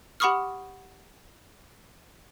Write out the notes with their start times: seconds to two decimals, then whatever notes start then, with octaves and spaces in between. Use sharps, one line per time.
0.20 G4 F#5 B5 C#6 D#6 F6